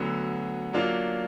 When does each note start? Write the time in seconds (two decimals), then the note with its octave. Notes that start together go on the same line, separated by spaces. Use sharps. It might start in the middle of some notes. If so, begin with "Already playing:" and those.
Already playing: D2 D3 F#3 B3
0.73 F#3 A#3 D4 F4